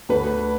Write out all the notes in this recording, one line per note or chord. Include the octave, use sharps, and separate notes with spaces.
D2 D3 B4